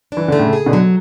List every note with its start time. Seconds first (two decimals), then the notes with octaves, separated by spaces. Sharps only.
0.12 E3 D4
0.28 D3 A3
0.39 A2 C#3
0.53 G#4
0.66 B2 D3
0.73 F#3